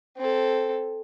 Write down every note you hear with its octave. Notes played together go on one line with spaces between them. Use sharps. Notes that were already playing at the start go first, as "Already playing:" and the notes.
C4 A4